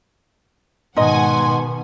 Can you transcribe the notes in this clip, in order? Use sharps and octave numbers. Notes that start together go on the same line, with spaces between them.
G#2 B2 D#3 D#4 D#5 F#5 G#5 C6